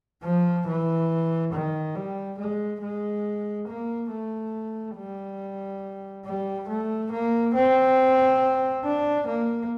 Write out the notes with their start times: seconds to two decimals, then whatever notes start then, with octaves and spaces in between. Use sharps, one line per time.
0.24 F3
0.67 E3
1.53 D#3
1.95 G3
2.39 G#3
2.82 G#3
3.67 A#3
4.11 A3
4.97 G3
6.25 G3
6.69 A3
7.12 A#3
7.55 C4
8.84 D4
9.27 A#3